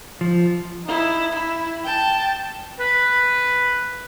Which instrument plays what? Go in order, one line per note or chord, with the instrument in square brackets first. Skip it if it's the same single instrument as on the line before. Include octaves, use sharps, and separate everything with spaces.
[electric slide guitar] F3
[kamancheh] D#4 E4
E4
G5 A5
[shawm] B4